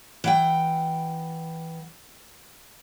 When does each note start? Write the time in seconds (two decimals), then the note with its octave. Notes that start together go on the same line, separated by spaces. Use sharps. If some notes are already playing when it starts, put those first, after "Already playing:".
0.24 E3 F#5 G5